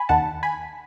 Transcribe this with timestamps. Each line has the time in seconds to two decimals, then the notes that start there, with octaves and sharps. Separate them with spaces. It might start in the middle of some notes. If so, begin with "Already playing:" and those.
Already playing: G#5 B5
0.09 D#2 D#3 F#5 A5
0.43 G#5 B5